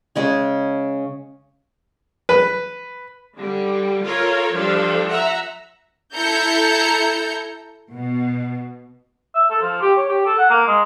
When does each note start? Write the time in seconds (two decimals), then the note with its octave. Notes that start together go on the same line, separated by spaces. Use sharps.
0.16 C#3 G#3 G#4
2.29 B4
3.39 D3 G3
4.05 F4 A4 A#4 C#5
4.54 F3 G3 D4 A4
5.10 E5 F#5 A#5
6.15 E4 A4 A#5 G6 C#7
7.92 B2
9.34 E5
9.50 A4
9.62 F3
9.82 G4
9.97 C#5
10.09 G4
10.25 A4
10.38 F#5
10.50 A#3
10.67 G#3